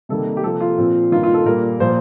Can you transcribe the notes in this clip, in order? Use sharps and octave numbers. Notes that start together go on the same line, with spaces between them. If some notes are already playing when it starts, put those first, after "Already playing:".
C3 D#3 G3 A#3 A4
G4
C3 F3 A#3 A4
F4
A#2 F3 C4
G2 D#3 A#3 F4
F4
A4
A#2 G3 A#3 A#4
A#2 F3 A#3 C5